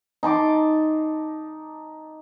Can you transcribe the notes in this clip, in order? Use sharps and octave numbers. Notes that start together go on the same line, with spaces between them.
D#4 A5 C6 D6